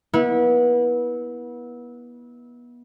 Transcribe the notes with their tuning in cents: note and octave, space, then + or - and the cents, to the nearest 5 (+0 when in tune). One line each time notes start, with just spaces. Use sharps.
B3 -30 E4 -25